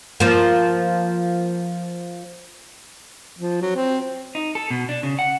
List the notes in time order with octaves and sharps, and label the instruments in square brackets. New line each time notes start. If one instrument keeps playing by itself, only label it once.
[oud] F3 A#3
[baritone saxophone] F3
F#3
C4
[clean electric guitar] D#4
A4
B2
D4
C#3
F#5